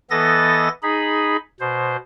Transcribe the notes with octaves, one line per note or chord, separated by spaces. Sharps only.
E3 B3 A4 D#5 A6 A#6
D#4 G#4 B5
B2 C5